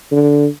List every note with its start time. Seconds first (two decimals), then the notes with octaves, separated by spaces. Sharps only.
0.12 D3